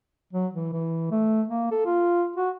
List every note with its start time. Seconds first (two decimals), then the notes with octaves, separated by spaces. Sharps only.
0.33 F#3
0.53 E3
0.73 E3
1.11 A3
1.48 A#3
1.71 A4
1.86 F4
2.36 F#4